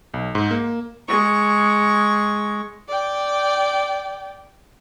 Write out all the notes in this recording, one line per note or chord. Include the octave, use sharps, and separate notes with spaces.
B1
G#2
A#3
G#3 C#6
D5 G5